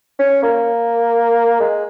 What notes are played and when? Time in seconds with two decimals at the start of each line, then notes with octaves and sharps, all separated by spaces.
0.19 C#4
0.43 A#3
1.60 G#3